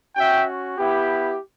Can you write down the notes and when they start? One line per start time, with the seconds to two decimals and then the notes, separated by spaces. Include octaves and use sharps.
0.16 C#4 F#4 E5 G5
0.78 B3 E4 G4